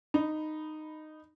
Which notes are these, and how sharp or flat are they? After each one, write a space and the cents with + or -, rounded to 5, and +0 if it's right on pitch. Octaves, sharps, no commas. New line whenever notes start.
D#4 -10 B5 +0